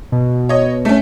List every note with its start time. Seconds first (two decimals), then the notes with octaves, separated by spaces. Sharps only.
0.12 B2
0.49 C#5 D#5
0.85 A3 C#4